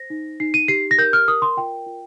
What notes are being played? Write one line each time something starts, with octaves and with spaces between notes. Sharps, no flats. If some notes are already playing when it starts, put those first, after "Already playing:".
Already playing: C5 A#6
D#4
D#4 C7
D#7
G4 C7
A#6
A#4 G6
F6
A#4 D#6
C6
F4 G5
F4